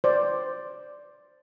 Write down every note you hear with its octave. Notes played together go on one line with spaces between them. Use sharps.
C5 D5